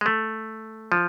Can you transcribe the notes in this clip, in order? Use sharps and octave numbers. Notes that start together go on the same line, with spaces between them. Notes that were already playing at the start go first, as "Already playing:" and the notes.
G#3
A3
F3